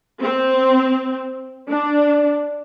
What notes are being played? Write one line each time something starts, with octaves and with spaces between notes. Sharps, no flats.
C4
D4